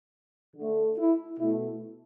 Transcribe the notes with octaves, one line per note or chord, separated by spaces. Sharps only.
D3 A3
E4
B2 A3 E4